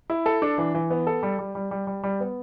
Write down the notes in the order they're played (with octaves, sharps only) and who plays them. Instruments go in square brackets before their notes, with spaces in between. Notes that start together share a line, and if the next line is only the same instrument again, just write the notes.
[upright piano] E4
A4
D4
E3
E3
B3
A4
G3
G3
G3
G3
G3
G3
B3